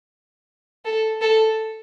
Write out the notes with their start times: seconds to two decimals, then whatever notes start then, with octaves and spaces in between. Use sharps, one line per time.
0.85 A4
1.22 A4